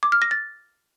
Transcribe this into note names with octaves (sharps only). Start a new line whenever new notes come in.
D6
F6
A#6
A6